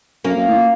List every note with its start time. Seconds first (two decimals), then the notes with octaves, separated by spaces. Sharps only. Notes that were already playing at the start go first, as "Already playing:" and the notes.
0.24 F#2 A#3 C#4
0.36 F#2
0.47 A2
0.57 A#2